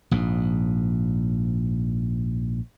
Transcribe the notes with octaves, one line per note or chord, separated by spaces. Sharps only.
A#1 G#2